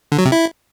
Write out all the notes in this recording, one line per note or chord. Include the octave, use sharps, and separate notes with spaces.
D3
F#3
C3
E4